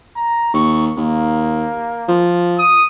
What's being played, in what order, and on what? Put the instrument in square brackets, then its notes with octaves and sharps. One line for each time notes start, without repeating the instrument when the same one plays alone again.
[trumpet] A#5
[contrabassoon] D#2 [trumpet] C#6
[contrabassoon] D#2 [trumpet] A#3
[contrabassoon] F3
[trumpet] D#6